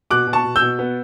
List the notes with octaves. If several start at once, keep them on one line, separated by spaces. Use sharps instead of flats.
B2 D6 F#6
B2
A5 C#6
B2
E6 G6
B2
B3